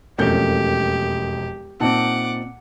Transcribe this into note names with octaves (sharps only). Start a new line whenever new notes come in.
E1 F2 A3 A#3 C#4 G4 G6
A#2 C4 D#4 F#5 A5 D6